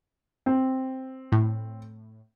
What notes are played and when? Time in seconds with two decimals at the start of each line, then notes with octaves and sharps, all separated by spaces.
0.46 C4
1.32 A2